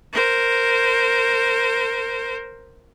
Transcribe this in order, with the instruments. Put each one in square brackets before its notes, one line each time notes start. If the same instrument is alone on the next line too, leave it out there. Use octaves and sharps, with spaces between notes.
[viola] A#4 C5